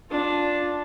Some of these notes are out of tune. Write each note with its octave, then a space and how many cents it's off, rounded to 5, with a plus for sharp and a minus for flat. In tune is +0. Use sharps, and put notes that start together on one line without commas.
D4 +0 F4 +15